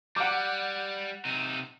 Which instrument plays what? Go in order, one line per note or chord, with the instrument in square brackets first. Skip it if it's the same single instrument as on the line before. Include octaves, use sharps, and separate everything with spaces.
[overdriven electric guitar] G3 [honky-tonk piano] F#5 D6
[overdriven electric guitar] C3 D#4